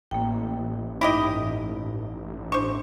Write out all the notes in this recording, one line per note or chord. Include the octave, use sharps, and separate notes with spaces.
A1 A#3 G5
G2 D#4 E4 G4 D#5 D6
D4 C5 C#6